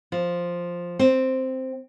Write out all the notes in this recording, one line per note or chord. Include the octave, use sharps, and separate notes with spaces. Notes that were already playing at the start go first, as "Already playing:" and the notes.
F3
C4